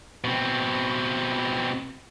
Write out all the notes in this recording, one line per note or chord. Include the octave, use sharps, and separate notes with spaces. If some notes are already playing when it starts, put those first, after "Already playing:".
B2 C4